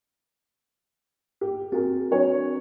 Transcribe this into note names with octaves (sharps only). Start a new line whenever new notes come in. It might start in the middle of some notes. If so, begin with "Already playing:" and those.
G4
C4 F#4 G#4 A#4
F#3 D4 C#5